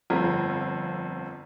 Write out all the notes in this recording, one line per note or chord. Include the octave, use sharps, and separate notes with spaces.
G1 F2 A#5